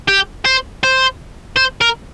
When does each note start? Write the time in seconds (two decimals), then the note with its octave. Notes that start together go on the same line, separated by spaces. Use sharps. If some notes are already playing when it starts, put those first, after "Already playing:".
0.09 G4
0.46 C5
0.84 C5
1.57 C5
1.81 A#4